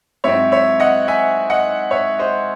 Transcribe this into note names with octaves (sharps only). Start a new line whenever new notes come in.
G#2 F#3 C4 E4 C#5 E5
C#5 E5
D#5 F#5
E5 G#5
D#5 F#5
C#5 E5
C5 D#5